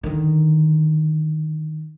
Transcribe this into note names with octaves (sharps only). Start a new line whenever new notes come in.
D3 D#3